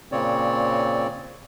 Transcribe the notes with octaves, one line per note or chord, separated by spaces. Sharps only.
A#2 C#3 C4 C#5 D5